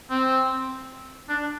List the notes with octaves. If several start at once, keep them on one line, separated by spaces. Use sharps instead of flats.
C4
D4